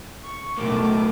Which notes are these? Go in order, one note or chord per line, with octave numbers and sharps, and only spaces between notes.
C#6
B2 D#3 F#3 A3 A#3 D6